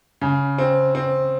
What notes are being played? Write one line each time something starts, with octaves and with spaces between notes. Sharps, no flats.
C#3
C4
C4